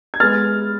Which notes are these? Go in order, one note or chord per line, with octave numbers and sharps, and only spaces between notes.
G#6
G#3 B3 F6 A6